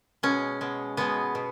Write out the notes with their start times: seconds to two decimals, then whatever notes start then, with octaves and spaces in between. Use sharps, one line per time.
0.23 B2 G#3 C#4
0.61 B2 G#3
0.97 B2 G#3 B3
1.35 B2